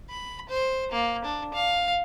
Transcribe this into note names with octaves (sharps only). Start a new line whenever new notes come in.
B5
C5
A#3
D4
F5